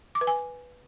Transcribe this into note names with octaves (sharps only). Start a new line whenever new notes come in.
D6
B4
G#5